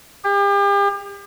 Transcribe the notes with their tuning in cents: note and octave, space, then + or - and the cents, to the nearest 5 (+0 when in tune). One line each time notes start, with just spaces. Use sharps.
G4 +40